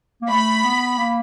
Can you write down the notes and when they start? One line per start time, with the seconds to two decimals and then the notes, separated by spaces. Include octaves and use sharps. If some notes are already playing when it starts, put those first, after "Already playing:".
0.22 A#3
0.29 A3 B5
0.64 B3
0.98 A#3